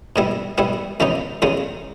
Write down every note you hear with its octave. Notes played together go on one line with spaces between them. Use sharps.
G#2 G3 B3 E4
G#2 G3 B3 E4
E2 C#3 G#3 B3 D#4
E2 C#3 G#3 B3 D#4